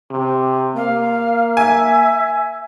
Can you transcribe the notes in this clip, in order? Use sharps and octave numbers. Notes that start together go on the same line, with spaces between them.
C3
A#3 F5
E5 G#5